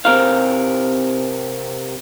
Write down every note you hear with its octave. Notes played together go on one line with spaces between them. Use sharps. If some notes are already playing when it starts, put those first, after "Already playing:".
C3 C4 A#4 F5